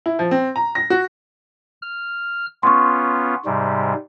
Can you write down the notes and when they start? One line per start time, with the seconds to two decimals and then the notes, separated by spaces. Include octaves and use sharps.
0.06 E4
0.19 F3
0.31 C4
0.56 A#5
0.75 A#6
0.90 F#4
1.82 F6
2.63 B3 C#4 F4 C6 C#6
3.46 G#2 C3 G3